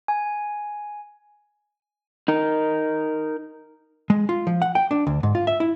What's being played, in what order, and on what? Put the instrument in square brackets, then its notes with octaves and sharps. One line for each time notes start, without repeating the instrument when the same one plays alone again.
[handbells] G#5
[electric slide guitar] D#4 A#4
[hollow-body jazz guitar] G#3
F4
F3
F#5
G5
D4
D2
G#2
F4
E5
E4